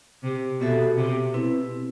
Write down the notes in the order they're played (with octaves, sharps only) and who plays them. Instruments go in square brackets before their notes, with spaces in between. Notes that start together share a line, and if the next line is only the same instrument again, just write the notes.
[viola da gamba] C3
[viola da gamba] B2 [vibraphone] B3 F#4 A4 E5
[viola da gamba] C3
[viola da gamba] B2 [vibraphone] C4 E4 B4